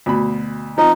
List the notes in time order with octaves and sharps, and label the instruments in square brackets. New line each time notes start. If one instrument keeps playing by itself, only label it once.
[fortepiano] D2 B2 B5
[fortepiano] F3 C4 [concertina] D#4